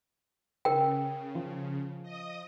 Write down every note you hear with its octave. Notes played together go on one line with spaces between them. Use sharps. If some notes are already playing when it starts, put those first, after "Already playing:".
C#3 A#4 G5
F3
D#5 D#6